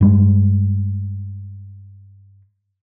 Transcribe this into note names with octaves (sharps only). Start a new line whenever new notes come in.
G2 G3 G#3